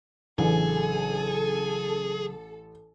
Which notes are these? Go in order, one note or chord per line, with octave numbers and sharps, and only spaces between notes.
A1 C#3 F#3 D4 G#4 A4